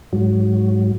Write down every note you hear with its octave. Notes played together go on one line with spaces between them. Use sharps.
G#2 F#3